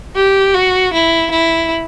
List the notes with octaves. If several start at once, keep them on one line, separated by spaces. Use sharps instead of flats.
G4
F#4
E4
E4